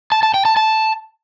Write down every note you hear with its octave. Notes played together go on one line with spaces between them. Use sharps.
A5
A5
G5
A5
A5